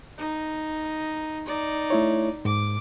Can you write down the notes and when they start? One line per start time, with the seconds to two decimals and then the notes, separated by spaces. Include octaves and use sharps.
0.18 D#4
1.46 D#4 D5
1.90 A3 E4 C#5
2.45 G#2 D6